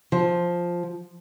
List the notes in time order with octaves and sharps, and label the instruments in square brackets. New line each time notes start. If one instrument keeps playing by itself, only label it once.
[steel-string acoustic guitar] F3